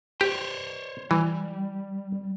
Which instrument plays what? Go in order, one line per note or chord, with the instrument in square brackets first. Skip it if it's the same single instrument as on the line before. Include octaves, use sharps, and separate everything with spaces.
[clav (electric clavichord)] G4 [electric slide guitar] C5 C#5
[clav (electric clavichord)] E3 [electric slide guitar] G3